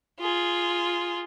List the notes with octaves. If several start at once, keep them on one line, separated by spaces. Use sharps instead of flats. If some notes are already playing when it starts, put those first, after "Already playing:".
F4 G#4